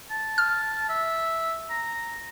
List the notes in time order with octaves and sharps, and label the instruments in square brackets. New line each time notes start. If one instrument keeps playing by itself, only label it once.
[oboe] A5
[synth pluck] F6
[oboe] E5
A#5